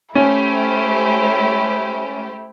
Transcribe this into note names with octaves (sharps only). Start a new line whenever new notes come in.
A3 C#4 E4 G4 C5